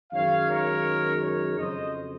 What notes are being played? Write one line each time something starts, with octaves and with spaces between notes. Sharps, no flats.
F#2 D#3 G#3 C#5 F5
A#4 C#5
A#4 C#5
F2 C#3 F#3 C5 D#5